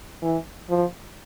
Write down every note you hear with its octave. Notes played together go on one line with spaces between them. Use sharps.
E3
F3